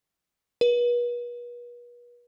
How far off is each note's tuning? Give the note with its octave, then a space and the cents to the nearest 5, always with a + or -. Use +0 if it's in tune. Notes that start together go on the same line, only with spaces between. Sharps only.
B4 -40